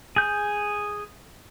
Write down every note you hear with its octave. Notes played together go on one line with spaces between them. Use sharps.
G#4 G6